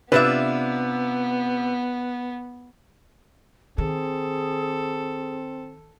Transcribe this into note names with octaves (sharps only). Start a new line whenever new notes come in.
C3 B3 D4 F4 B4 E5
D#3 C4 G#4 A4